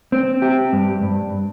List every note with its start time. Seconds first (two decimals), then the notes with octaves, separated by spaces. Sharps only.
0.12 C4
0.42 G4
0.73 G2
1.03 G2